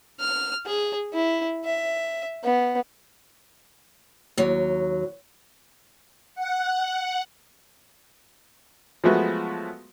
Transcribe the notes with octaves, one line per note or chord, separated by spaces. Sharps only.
F6
G#4
E4
E5
B3
D#2 F#3
F#5
F3 F#3 G#3 A3 B3 F#4